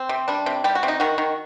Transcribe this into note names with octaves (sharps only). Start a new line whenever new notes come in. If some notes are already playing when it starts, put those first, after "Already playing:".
Already playing: C4
C3
G3 D4
C3
G3 G4
F#4
C3
D#4
D#3 F#4
D#3